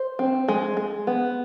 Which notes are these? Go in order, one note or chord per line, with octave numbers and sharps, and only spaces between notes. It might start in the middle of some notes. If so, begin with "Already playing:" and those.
Already playing: C5
C4
G#3
G#3
B3